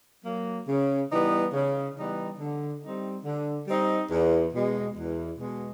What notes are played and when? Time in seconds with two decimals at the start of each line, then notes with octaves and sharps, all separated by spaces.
0.25 F#3 A#3
0.68 C#3
1.11 E3 G3 B3 D#4
1.53 C#3
1.96 E3 G3 B3 D#4
2.39 D3
2.82 G3 C4 D#4
3.25 D3
3.67 G3 C4 D#4
4.10 E2
4.54 B2 G#3
4.97 E2
5.39 B2 G#3